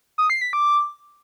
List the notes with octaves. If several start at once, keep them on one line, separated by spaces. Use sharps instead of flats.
D#6
C7
B6
D6